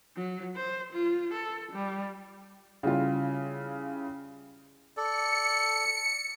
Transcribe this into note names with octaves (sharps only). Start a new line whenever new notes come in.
F#3
C5
F4
A4
G3
C#3 G3 E4 F4
A4 D5 C#7